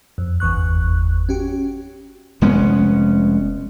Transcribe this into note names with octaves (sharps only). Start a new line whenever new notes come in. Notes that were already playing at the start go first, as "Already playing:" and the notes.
F2
G1 E2 C#6 F#6
C#4 F#4 G4
F1 G#3 B3 C#4